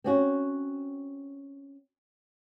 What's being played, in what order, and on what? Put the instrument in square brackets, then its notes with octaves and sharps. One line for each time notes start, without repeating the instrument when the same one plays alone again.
[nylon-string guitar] C4 C#4 F#4